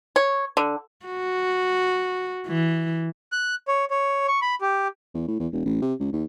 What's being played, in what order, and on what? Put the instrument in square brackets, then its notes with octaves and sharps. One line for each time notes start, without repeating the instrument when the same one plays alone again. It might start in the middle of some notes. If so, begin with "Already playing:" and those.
[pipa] C#5
D3
[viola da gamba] F#4
E3
[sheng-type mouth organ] F#6
C#5
C#5
C#6
B5
G4
[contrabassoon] E2
A2
E2
E1
A1
C3
C#2
D#2